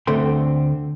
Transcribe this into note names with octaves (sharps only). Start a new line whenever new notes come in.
D2 D3 A3 C4 G5 C6